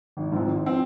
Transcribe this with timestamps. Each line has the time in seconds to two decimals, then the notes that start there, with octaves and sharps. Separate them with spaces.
0.17 G#1
0.32 G#2 F3 C4
0.47 G#1
0.65 F3 C4